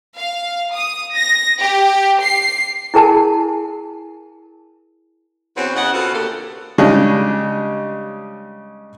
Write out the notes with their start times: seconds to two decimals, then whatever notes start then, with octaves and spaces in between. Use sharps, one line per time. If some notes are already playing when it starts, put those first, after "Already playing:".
0.17 F5
0.74 D#6
1.16 A#6
1.60 G4
2.23 C7
2.94 E4 G#4 A#4 G#5 A5
5.56 E2 C4 C#4 F#4 B4 C5
5.75 C#3 B3 C#5 D#5 F#5
5.92 B2 B3 C4 F4 F#4 A4
6.14 D2 A#3 G4 A4
6.78 C#3 G3 G#3 D4 D#4